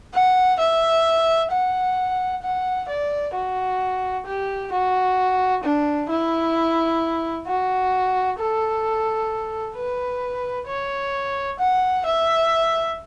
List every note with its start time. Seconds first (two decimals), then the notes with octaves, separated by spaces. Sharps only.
0.14 F#5
0.59 E5
1.52 F#5
2.42 F#5
2.88 D5
3.34 F#4
4.26 G4
4.72 F#4
5.63 D4
6.09 E4
7.47 F#4
8.39 A4
9.76 B4
10.67 C#5
11.59 F#5
12.05 E5